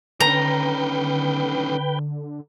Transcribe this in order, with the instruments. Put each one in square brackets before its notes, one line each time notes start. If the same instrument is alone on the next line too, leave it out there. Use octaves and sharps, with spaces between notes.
[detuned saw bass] D3 [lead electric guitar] D#3 C#4 [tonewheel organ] B4 G5 [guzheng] A#5